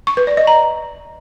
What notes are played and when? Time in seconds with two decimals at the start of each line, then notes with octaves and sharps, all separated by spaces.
0.07 C#6
0.17 B4
0.27 D5
0.37 D#5
0.47 A#5